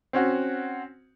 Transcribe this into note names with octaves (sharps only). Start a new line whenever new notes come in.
C4 C#4 F#4